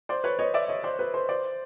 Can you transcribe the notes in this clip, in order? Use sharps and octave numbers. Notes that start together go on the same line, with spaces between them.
C5 D5
B4 C#5
C#5 D#5
D5 E5
C#5 D#5
C5 D5
B4
C5
C5 D5